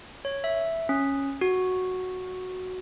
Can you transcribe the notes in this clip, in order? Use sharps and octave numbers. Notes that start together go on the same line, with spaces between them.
C#5
E5
C#4
F#4